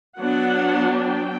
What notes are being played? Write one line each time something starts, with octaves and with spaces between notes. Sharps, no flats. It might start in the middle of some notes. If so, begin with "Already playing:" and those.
F#3 B3 D4 F#5
G5